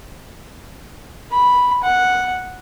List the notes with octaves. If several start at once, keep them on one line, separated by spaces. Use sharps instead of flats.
B5
F#5